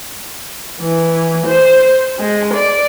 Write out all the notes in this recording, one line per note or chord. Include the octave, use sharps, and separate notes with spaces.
E3
C5
G#3
D5